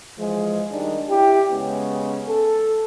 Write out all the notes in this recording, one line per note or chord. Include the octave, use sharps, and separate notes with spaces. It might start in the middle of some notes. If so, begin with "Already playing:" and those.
E3 F3 G#3
D#3 G3 D4 D#4
E4 G4
C#3 G#3 B3 C#4
A4